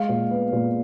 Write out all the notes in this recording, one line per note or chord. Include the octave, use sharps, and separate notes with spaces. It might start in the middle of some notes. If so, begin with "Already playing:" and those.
Already playing: G#3 F5
A#2
B3
A#2